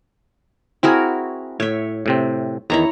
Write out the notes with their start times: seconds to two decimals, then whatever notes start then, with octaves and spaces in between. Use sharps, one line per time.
0.83 C4 E4 F#4 G#4 A#4 G#5
1.60 A2 C#5 E5
2.06 A2 C3 C4
2.70 E2 D#3 E4 C#5 A#5